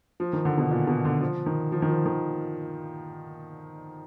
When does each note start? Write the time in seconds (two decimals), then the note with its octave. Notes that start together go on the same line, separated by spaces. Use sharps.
0.20 F3
0.33 D#3
0.45 D3
0.58 B2
0.71 A#2
0.87 B2
1.05 D3
1.21 F3
1.46 D#3
1.72 F3
1.82 D#3
1.89 F3
2.06 D#3